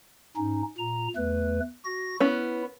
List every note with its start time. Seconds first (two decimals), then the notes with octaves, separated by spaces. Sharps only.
0.36 G#2 C#4 D#4
0.78 A#2 A#5
1.16 E2 A3 B4
1.85 F#4 A#6
2.20 B3 C#4 E4